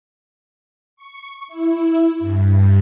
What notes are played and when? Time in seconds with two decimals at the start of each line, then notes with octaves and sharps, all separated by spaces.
0.96 C#6
1.48 E4
2.19 G2